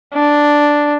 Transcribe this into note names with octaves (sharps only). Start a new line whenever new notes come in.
D4